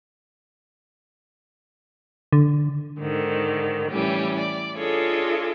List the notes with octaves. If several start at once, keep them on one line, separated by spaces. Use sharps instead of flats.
D3
G#2 D3 D#3
A2 E3 G3 C#4 G4
D5
D4 F4 G#4 A4 C#5 D#5